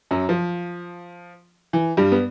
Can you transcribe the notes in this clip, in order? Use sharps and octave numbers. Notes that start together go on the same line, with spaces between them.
F#2 F#3
F3
E3
G2 G3
B3